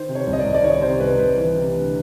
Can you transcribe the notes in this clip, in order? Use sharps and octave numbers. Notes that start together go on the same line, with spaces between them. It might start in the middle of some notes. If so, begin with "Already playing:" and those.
Already playing: D#3 C5
C3
C#5
C2
D#5
D5
C2
D5
D#3 C#5
C3 C5
C2 B4
C2 B4
E3
C3
D2